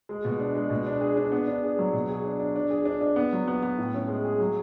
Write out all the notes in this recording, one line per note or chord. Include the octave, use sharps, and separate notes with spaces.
G#3
B2
D4
G#3
B2
D4
G#4
D4
B3
D4
G#4
F#3
B2
G#4
D4
D4
D4
G#4
D4
D4
B3
F#3
B3
B3
A2
C#4
G#3
G#4
F#3